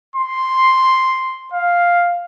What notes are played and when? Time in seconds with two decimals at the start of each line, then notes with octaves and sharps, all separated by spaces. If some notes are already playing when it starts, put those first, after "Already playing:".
0.16 C6
1.54 F5